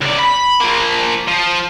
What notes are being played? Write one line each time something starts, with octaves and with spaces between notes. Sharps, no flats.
C#2 D5
B5
F3 A#3
F3